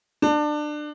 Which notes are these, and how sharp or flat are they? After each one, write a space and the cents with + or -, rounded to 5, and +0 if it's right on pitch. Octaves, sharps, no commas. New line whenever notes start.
D4 +25